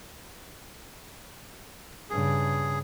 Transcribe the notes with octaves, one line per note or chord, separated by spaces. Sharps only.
G2 C#3 G#4